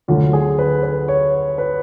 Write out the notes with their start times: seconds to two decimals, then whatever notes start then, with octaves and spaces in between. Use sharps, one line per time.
0.08 D2 D3 F#3 A3 F4
0.33 G#4
0.59 B4
0.83 B4
1.08 C#5
1.58 B4